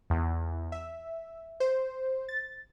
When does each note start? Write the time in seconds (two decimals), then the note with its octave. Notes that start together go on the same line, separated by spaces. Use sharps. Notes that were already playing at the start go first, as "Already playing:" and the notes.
0.10 E2
0.72 E5
1.60 C5
2.29 A6